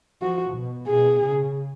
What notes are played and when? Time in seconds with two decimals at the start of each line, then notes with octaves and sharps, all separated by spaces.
0.21 F3 F#4
0.55 B2
0.88 B2 G#4
1.22 C#3